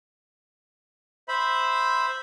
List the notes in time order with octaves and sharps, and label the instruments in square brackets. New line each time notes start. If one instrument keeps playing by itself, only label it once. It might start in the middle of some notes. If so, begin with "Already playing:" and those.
[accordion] C5 E5 B5